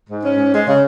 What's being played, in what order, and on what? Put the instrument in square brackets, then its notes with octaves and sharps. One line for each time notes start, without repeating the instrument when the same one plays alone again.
[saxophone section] G#2
C#4
G#2
G#3
C#3